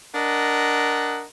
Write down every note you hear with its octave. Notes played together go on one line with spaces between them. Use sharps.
D4 A#4 D#5 F#5